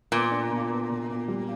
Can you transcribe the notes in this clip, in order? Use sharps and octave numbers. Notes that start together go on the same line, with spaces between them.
A#2 B3
D4
B2
B3
B2
B2
G3